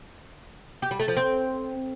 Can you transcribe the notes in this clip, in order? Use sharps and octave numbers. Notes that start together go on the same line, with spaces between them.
G4
G3
A3
F3
C4